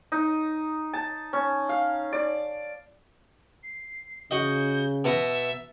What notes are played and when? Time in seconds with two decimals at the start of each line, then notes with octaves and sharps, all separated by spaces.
0.12 D#4
0.93 A5
1.33 C#4
1.69 F5
2.13 D5
3.63 C7
4.31 C#3 F#4 D#5 G6
5.04 B2 E5 A5 A#5